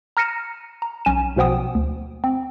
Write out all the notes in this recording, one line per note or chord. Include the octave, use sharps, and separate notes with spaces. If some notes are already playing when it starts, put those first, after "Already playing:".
A#5 F6 A#6 C#7 D#7 E7
A#5
B1 C#4 D#7 E7
B1 B2 F3 B3 G5 D#6
D2
C4